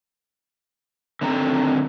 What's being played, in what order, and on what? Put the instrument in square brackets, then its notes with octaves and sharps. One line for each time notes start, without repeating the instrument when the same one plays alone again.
[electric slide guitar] D3 D#3 A3 C4 A#5